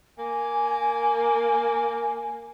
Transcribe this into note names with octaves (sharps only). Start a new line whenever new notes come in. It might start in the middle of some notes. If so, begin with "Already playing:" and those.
A#3 G#5